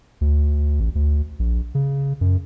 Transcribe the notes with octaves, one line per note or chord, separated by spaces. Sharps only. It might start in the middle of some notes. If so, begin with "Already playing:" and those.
D2
A1
D2
A#1
C#3
F#2